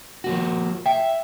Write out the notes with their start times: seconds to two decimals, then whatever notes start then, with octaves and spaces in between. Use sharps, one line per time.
0.24 F3 A#3 F#4
0.86 E5 G5